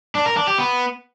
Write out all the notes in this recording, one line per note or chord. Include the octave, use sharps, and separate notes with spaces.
D4
A#4
D4
G4
B3